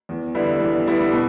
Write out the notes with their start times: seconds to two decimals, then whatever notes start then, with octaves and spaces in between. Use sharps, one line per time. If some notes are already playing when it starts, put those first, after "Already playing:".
0.09 E2
0.34 D3 G3 B3 E4
0.60 E2
0.86 D3 G3 B3 E4
1.12 B2